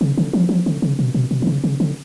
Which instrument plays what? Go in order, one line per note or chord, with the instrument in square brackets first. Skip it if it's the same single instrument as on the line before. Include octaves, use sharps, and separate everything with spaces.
[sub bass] C#3
D3
F3
F3
D3
C#3
B2
B2
B2
D3
C#3
C#3
D3